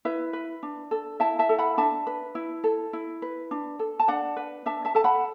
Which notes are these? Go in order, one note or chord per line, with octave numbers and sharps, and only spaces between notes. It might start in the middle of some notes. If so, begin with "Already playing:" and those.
E4 B4 E5
B4
D4
A4
E4 E5 A5
E5 A5
A4
F#5 B5
D4 E5 A5
B4
E4
A4
E4
B4
D4
A4
A5
D4 D5 F#5
B4
D4 E5 A5
E5 A5
A4 A5
F#5 B5